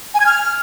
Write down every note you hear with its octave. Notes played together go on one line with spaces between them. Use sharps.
G#5
G#6
F6